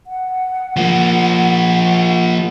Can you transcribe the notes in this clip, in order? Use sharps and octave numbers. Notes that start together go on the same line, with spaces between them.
F#5
F3 A#3